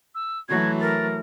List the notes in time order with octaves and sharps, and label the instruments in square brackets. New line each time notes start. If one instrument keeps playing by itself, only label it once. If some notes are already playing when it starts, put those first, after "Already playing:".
[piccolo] E6
[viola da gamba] E3 F#3 A3 [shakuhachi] F#4 [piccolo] G#6
[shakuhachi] A#4 [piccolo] A6